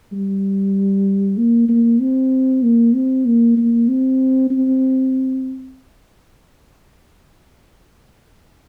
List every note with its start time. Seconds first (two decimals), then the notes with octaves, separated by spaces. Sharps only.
0.12 G3
1.37 A#3
1.69 A#3
2.00 C4
2.63 A#3
2.94 C4
3.25 A#3
3.57 A#3
3.88 C4
4.51 C4